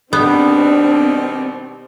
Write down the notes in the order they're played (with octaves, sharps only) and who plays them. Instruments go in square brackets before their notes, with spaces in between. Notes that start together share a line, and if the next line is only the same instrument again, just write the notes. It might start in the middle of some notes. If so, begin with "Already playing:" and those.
[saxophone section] B2 D#3 G3 [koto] B3 [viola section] C4 [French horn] D4